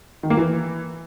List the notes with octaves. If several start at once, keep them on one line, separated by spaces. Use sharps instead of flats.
D#3
A#3
E3